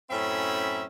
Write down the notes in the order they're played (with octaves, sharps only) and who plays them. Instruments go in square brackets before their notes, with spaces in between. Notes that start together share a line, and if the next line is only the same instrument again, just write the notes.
[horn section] F#2 A2 C4 C#4 E5 B5